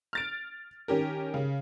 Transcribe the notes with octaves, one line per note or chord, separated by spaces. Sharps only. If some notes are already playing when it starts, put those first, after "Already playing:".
F6 A6 D7
D#3 C#4 G4 A#4
C#3